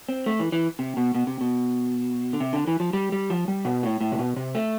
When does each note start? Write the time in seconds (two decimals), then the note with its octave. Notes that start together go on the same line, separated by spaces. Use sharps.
0.09 C4
0.26 A3
0.39 E3
0.52 E3
0.79 C3
0.97 B2
1.15 B2
1.27 C3
1.41 B2
2.33 D3
2.40 C3
2.53 D3
2.67 E3
2.80 F3
2.93 G3
3.12 G3
3.30 F3
3.48 G3
3.65 B2
3.83 A2
4.01 A2
4.12 C3
4.19 B2
4.36 C3
4.55 A3